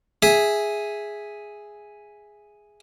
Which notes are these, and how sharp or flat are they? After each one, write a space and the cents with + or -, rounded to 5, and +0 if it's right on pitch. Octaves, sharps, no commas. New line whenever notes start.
G#4 +0 E5 +0